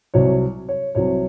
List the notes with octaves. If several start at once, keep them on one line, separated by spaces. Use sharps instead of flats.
C2 C3 F#3 C#5
C#5
C2 C3 F#3 C#5